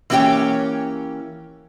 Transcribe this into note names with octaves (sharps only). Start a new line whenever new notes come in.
E3 A#3 C#4 G4 C#5 G5